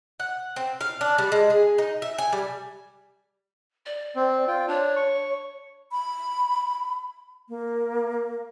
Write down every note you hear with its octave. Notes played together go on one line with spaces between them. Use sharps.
F#5
C4
F5
D4
G3
G#3
G#4
D#4
E5
G#5
G3
D5
C4
F4 G5
D4 C#5
C#6
B5
A#3